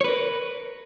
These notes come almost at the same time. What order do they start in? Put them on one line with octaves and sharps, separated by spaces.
C#5 B4 A#4